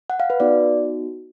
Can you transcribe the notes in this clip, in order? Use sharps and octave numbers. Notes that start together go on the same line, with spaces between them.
F#5
F5
B4
B3 D#4 F#4 D5